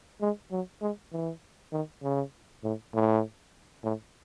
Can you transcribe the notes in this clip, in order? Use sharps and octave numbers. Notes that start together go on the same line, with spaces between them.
G#3
F#3
G#3
E3
D#3
C#3
A2
A2
A2